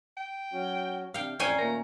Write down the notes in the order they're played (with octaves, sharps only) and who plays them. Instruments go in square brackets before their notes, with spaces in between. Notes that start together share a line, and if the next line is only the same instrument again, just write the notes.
[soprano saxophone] G5
[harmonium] F#3 C#4 F#4
[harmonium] C3 D4 [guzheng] F5 G5
[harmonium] F2 A2 [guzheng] C#4 G5 G#5 [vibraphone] C5 D5 A#5
[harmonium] A#2 D#3 A3 [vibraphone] A#3 A#4 [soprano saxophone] A#5